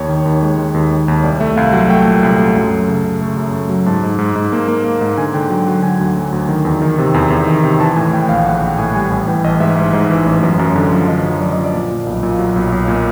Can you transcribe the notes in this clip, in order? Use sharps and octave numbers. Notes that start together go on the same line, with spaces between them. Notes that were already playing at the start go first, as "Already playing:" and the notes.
Already playing: D#2 C#5
D#3
D#2
G#3
D#3
D#2
D#2
D#2
C2 D5
A3 E5
C2 F5
F#3 F#5
A3 G5
A#2
C2
A3
F#2
F#3
C#3
C#3
A3
F#2
A3
F#3
G#2 A5
G#2
G#2
G#2
A#3
A#3
A#3
G#2
D3 G#5
D3 G5
F#3 G5
F#3 F#5
D3 G#5
D2
F#3
D2
D#3
E2
D#3
C3
E2
E2
D#3
C3
E3 A5
A2 G#5
A2 G5
A#1 F5
A#1 F#5
A#1 G5
A2 G#5
G3 G#5
A1 G#5
E3 G5
A1 D#5
G#2 E5
G#2
G#2
E3
A1
F#2
F#2
D3
F3
D3 D#5
F#2
F3 D5
F3 D#5
D5
A#2
A#2
B1
A#2
F#3
B1
B1
A#2